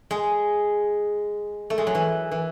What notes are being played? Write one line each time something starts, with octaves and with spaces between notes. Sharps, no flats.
G#3
A3
G#3
F#3
E3
E3